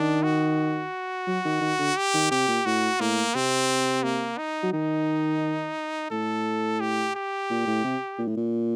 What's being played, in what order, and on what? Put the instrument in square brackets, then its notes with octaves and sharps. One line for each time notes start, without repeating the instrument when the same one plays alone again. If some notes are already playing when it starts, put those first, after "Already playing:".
Already playing: [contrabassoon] D#3 [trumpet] D4
[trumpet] F#4
[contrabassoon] F#3
D#3
D#3
D3
[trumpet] G4
[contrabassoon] D#3
[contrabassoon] C3 [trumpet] G4
[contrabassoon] A#2
[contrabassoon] A2 [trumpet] F#4
[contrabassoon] A2 [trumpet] A#3
[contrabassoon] C3 [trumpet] C4
[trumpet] A#3
D#4
[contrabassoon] F#3
[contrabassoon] D#3 [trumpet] D#4
[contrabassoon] A2 [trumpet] A4
[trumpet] G4
G4
[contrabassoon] A#2
A2
C3
A#2
A2
A#2